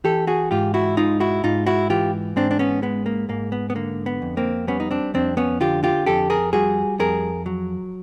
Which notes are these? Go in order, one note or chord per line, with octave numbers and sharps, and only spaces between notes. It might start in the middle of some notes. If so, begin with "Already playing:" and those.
E3 G4 A4
F#4 G#4
G#2 F4 G4
E4 F#4
G#3 D#4 F4
E4 F#4
G#2 D#4 F4
E4 F#4
E3 F4 G4
G#2 C4 D4
D4
B3 C#4
G#3 B3
A#3
G#2 A#3
B3
B3
D3 A#3
B3
F2
A#3 C4
G3 B3 C#4
D#4
C4 D4
F2 C4 D4
B3 C#4
D3 F4 G4
F4 G4
F2 G4 A4
G#4 A#4
G3 F#4 G#4
F2 G#4 A#4
F#3